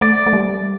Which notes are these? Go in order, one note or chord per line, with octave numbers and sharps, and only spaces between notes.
A3 D5
A3
G3